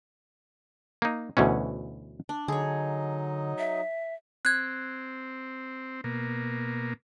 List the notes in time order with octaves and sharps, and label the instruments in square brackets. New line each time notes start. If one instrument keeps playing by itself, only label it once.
[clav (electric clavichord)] A#3 D#4
D2 B2 E3 C#4
[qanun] D4
[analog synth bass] D3 [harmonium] F#3 D#4 D#5 [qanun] G#4 C#5
[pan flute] E5
[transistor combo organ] C4 [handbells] F#6 G#6
[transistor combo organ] B2 A#3